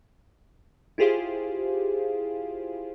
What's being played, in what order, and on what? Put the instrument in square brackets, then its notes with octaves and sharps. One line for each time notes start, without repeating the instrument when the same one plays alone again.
[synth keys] E4 F4 G4 G#4 C5 F5